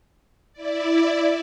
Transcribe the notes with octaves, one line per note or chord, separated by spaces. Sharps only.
E4 D5